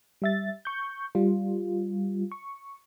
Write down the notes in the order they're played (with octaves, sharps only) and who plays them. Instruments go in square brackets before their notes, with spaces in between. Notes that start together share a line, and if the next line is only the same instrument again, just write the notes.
[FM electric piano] G3 E5 A6
C#6 G6
G3 F4
C#6